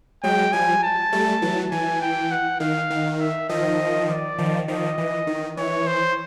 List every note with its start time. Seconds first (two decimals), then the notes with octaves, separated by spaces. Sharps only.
0.24 F#3 G#3 G5
0.53 F3 G3 G#5
0.83 A5
1.12 G3 A3
1.42 E3 F#3
1.71 E3 G#5
2.02 G5
2.32 F#5
2.60 D#3 F5
2.90 D#3
3.19 E5
3.49 D#3 F3 D#5
4.09 D5
4.38 D#3 F3
4.68 D#3 F3 D#5
4.98 E3
5.27 D#3
5.57 E3 C#5
5.87 C5